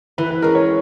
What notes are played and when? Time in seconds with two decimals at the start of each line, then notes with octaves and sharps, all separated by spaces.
0.18 E3 B4
0.30 B4
0.42 G#3 C#4 A#4
0.55 C#5